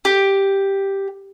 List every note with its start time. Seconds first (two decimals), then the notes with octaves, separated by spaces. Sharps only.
0.05 G4